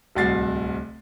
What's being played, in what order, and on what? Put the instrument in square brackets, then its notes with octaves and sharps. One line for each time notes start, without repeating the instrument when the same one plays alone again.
[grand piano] D1 C2 F#4 A6 C7